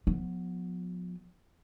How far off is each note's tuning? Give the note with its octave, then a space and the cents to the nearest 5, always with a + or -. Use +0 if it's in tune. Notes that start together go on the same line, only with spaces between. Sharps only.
F3 +40 B3 +0